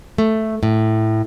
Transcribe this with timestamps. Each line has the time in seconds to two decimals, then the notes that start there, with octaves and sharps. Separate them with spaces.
0.18 A3
0.63 A2